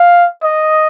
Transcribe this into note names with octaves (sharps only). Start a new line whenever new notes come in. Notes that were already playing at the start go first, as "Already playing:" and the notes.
Already playing: F5
D#5